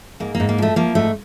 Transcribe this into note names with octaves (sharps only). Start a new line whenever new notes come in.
G#2 A#3
A#3
G#2
A#3
F3 A3
F3 A#3
G#2 A3